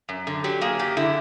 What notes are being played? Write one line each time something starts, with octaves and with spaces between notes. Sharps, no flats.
F#2
D3
F#3 G4
A#3 G#4
F#2 G4
D3 E4